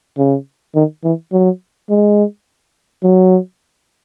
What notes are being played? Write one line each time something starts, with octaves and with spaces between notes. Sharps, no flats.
C#3
D#3
E3
F#3
G#3
F#3